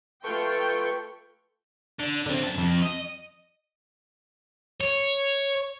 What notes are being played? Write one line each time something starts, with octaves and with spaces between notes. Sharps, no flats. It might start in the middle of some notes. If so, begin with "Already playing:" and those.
A3 F4 A4 B4 G5 C#6
D3
D3 C4
F#2 A5
F2
D#5
C#5